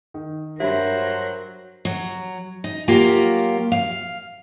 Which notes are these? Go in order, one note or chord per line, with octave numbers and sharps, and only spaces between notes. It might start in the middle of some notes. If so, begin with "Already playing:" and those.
D#3
G2 F#3 G3 A#4 C5 E5 B5
F#3
D#4
F#3 A#3 F4 G4
F5